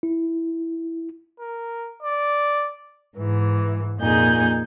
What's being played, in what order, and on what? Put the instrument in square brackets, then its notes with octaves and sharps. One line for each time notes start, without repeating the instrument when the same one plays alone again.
[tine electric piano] E4
[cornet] A#4
D5
[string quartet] G#2 E3
F2 A#2 D#4 G#4 G6